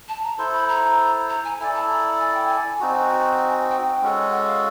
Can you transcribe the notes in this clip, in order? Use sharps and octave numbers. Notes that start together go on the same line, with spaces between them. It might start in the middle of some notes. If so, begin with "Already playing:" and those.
A5
A#5
E4 A4 C5 C6
B5
A#5
A#5
G#5
E4 A4 D5 G#5
A5
A#5
G#5
G5
G#5
C4 D#4 F#4
G#5
G5
G#3 C#4 F#4 A4
F#5
F5